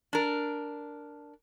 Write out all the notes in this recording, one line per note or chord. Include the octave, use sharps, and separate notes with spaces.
D4 A#4